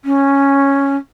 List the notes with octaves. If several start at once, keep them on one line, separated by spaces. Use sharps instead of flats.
C#4